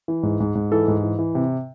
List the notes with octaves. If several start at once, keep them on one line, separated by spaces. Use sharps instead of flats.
E3
G#2
G#2
G#2
E3 A4
G#2
E3
E3
C3